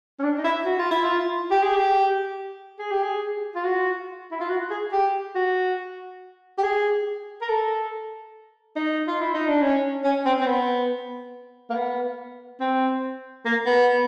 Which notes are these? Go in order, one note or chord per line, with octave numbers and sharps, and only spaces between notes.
C#4
D4
D#4
E4
F#4
F4
E4
F4
G4
G#4
G4
G#4
G4
G#4
F4
F#4
E4
F4
F#4
G#4
G4
F#4
G4
G#4
A#4
A4
D#4
F4
E4
D#4
D4
C#4
C#4
C4
C4
B3
A#3
B3
C4
A#3
B3